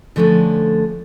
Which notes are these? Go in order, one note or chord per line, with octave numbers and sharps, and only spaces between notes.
D3 F3 A3 C#4 D4